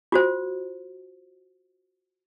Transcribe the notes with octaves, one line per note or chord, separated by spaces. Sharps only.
F4 F#4 C5